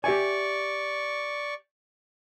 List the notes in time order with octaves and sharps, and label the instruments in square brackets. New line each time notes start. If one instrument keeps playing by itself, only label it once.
[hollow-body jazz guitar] G4 E5 G#5 [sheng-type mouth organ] D5 C#6